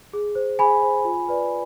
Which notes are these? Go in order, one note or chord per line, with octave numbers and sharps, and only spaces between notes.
G#4
C5
G#4 G#5 B5
C5
F4
B4 D5